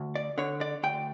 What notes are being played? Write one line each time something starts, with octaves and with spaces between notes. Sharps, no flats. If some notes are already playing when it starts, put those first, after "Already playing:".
Already playing: D2
D5
D3 C#5
D5
D2 G5